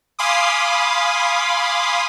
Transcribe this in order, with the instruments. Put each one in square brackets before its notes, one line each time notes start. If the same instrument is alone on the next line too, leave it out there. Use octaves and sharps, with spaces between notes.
[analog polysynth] F5 G#5 B5 C6 D6 D#6